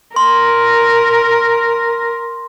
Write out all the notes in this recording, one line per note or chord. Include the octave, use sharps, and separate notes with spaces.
A#4 C6